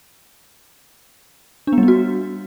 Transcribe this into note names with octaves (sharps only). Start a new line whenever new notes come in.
D4
B3
G3
B3
F#4